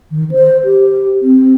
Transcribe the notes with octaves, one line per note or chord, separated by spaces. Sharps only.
D#3
C5
G4
C4